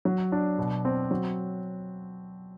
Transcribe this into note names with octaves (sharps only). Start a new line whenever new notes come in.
F#3
D4
B2
C4
F#3